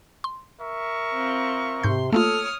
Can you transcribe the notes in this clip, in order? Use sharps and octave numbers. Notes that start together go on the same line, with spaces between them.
C6
A#4 E5 C#6
C4 F4
G#2 C3 C6 G6
A3 A#3 F4 A4 C#5 D#6 F6